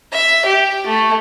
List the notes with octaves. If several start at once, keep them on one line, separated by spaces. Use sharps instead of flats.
E5
G4
A3